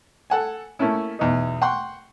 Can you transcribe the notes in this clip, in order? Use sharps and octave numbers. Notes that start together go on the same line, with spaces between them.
A4 F#5 G#5
A3 A#3 C#4 E4
B1 E2 D#4
F#5 G5 C6 C#6